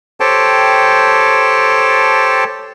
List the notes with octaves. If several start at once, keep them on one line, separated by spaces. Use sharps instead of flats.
G4 A4 C5 C#5 G5 A5